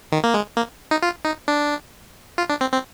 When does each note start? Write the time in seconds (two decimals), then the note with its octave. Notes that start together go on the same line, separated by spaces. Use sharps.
0.12 D#3
0.24 A#3
0.34 G#3
0.57 A#3
0.91 D#4
1.02 F4
1.25 D#4
1.48 D4
2.38 F4
2.50 D4
2.61 C4
2.73 C4